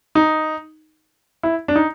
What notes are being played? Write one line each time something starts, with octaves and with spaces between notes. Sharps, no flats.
D#4
E4
D4
D#4